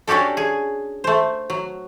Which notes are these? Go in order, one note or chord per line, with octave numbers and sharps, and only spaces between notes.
C#4 D4 F#4 G4 A4
G#4
A3 C5
F#3